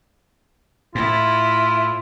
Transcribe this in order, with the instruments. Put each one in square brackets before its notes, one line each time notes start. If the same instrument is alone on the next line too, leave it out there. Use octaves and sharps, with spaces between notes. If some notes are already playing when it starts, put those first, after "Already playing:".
[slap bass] A2 [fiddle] E4 [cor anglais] F4